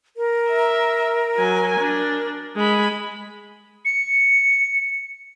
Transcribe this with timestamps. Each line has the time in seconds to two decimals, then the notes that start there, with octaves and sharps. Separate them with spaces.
0.17 A#4
0.50 E5
1.37 F#3 G#5
1.81 D4
2.56 G#3 B5
3.85 C#7